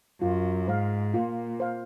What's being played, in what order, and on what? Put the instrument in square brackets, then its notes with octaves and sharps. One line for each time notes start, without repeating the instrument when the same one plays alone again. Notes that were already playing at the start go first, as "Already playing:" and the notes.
[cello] F#2 [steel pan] F4
[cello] G#2 [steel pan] C5 F5
[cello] A#2 [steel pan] F4
[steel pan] C5 F5